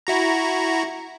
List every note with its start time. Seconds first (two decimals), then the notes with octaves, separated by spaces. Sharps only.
0.07 E4 F#4 A#5